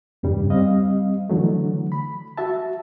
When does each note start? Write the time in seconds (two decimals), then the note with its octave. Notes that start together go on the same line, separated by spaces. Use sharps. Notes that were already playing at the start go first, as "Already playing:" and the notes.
0.23 E2 G2 C#3 G3
0.50 G3 C4 D#5 F5
1.30 D3 E3 F#3 A3
1.92 B5
2.38 F#4 E5 A5